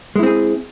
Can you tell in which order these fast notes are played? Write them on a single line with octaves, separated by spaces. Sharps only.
G#3 E4 C4 G#4